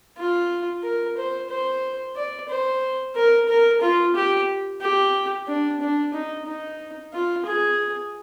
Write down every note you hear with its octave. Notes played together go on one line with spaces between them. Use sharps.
F4
A#4
C5
C5
D5
C5
A#4
A#4
F4
G4
G4
D4
D4
D#4
D#4
F4
G#4